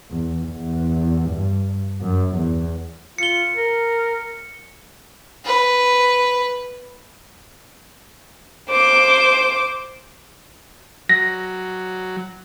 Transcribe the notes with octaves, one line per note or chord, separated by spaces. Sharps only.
E2
E2
G2
F#2
E2
F4 C#7 G7
A#4
B4
C5 D6
F#3 A#6